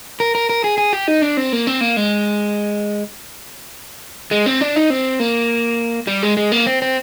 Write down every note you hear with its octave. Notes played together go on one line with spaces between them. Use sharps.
A#4
A#4
A#4
G#4
G#4
G4
D#4
D4
C4
A#3
C4
A#3
G#3
G#3
C4
D4
D#4
C4
A#3
G3
G#3
G#3
A#3
C4
C4